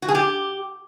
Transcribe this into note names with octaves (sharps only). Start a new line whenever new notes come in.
F#4
G#4
G4